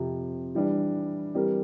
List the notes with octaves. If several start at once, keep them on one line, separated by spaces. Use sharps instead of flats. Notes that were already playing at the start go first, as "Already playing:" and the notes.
Already playing: F2 C3 F3
E3 G3 D4
E3 G3 C4 G4 A#4